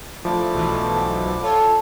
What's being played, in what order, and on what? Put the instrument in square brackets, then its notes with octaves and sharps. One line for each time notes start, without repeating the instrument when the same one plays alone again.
[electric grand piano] F3 [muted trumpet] A3 [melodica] D4 E4 D6
[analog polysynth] B1 B2 E3
[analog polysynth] F4 C#5 [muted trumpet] A4